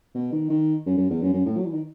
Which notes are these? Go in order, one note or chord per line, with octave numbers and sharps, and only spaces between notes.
B2
D#3
D#3
F#2
F#2
E2
F#2
F#2
A2
F#3
E3
D#3